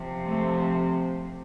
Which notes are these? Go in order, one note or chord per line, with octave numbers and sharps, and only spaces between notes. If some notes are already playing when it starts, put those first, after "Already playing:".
Already playing: C3 F3
A3